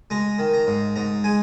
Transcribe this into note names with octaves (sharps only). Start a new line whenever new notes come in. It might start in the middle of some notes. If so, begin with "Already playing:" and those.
G#3 A#5
D#3
A#5
G#2
G#2 A#5
G#3 G#5